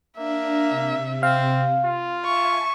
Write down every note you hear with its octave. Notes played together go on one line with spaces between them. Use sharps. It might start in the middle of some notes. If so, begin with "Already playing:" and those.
A#3 D4 E5
C3
C4 F5
F4
E5 G#5 A5 C#6